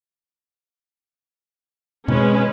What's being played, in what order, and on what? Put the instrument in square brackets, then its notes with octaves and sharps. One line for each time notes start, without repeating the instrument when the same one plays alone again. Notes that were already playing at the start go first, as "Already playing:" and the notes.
[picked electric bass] B2 D#3 C4 [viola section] G#3 C#4 B4